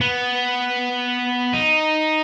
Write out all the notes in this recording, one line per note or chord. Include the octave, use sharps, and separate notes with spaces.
B3
D#4